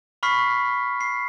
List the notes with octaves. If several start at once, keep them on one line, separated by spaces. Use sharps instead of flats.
B5 C#6 F6 B6 C7
C7